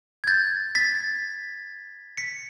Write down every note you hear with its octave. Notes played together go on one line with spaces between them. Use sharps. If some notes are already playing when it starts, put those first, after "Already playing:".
G#6
G6 A6
A6 B6
B6 C#7